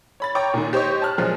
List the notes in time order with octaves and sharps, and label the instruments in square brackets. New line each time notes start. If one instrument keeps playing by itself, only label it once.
[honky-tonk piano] C#5 B5 A6
C#5 G5 A#5 C#6 D6
A#2 D#3
G4 C5 C#5 D#5 C#6
A5 F6 F#6
A#2 F3 F#3 G#3